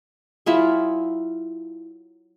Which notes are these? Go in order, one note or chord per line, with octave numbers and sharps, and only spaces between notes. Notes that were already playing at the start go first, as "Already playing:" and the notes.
F#3 E4 F4 G#4